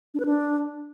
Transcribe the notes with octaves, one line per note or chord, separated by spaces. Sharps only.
D4
B4
D4